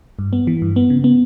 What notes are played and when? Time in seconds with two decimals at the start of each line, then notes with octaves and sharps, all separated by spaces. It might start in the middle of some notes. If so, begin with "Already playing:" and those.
0.19 G2
0.33 B3
0.47 E3
0.62 G2
0.76 B3
0.90 C#3
1.04 B3